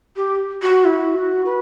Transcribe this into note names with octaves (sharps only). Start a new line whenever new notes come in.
G4
F#4
E4
F#4
B4